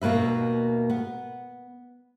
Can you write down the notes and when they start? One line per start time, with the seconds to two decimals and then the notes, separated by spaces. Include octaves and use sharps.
0.02 D#2 B2 A#3 B4 E5
0.90 B3